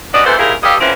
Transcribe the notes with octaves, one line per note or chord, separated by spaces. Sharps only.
C#4 F#4 G4 B4 D5 D#5
G#2 B2 E3 B3 A4 C5
G#2 G3 A#3 E4 G#4 A#4
G2 G4 A4 D#5 F5
D3 E3 F3 C4 C#4 E4